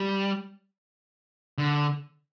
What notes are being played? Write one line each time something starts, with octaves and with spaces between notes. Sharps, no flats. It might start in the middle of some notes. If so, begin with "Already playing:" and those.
Already playing: G3
D3